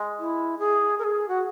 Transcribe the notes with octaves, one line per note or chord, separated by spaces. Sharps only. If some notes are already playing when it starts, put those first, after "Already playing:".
Already playing: G#3
E4
G#4
A#4
G#4
F#4